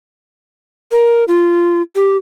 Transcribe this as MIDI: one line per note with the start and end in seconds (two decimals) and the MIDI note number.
0.92 1.24 70
1.28 1.82 65
1.96 2.17 67